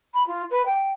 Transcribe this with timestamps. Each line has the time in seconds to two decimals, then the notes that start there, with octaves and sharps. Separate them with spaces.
0.14 B5
0.27 F4
0.51 B4
0.66 G5